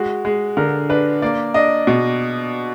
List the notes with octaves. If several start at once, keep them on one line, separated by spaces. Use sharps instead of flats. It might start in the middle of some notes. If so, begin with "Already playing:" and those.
Already playing: G#3 F#4
G#3
D3 A#4
D4 B4
A#3 D5
D4 D#5
B2